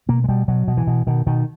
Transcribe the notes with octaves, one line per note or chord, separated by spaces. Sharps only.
B2 A#3
G#3
B2 G3
B2 F#3
B2
E3
B2
B2 D#3
B2 D#3